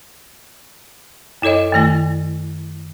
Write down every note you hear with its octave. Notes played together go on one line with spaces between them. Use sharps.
F#2 E4 A4 C#5 D#5
F#2 D#3 A3 G#5